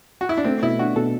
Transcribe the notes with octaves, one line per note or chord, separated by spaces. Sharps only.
F#4
E4
D4
A3 C4
B2 E4
D4 F#4
B2 A4